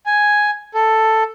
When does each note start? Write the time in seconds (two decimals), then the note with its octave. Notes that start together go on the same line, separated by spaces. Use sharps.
0.06 G#5
0.74 A4